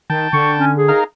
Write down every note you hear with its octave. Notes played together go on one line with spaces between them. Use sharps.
D#3 G5 A5
D3 C#6
C#4
G#4
D#4 A#4 F5